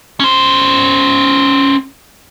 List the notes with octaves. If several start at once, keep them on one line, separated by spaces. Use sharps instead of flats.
C#4 C5